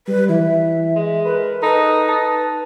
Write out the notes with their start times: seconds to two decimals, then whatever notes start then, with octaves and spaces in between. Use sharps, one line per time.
0.08 G3 B4
0.29 E3 E5
0.96 G#3
1.25 A#4 B4
1.63 D#4 A4 B4
2.08 D#4 A5